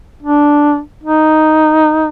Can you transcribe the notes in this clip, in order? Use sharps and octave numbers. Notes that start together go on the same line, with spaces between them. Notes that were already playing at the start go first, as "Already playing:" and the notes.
D4
D#4